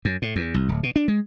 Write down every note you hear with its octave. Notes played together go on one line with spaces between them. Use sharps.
F#2
A2
E2
C2
D1
B2
D4
G#3